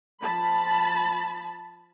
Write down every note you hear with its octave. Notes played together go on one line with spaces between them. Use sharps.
F3 A5 B5